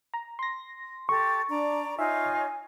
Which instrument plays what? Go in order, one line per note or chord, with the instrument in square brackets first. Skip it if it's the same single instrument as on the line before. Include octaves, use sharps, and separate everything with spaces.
[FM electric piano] A#5
C6 A#6
[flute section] G4 A4 [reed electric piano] C#6
[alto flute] D4 [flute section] D5 A#5
[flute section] D#4 F4 C#5 [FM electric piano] E5 [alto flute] G#5